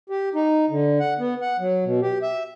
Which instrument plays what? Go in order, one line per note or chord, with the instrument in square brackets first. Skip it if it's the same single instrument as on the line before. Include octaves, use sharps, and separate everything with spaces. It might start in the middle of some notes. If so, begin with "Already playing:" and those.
[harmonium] G4
D#4
D3
F#5
B3
F#5
F#3
B2
G4
E5